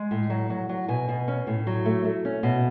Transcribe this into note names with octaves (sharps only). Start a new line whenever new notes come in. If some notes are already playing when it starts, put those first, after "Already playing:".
Already playing: G#3
A2
F#3
F#3
F#3
B2 G#5
B2
C#4
A2
F#3
A3
A3
C#4
B2